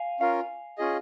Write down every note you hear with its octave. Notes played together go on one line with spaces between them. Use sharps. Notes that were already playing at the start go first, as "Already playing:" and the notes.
Already playing: F5 G#5
C#4 F4 A#4 F5
C#4 F4 G#4 D#5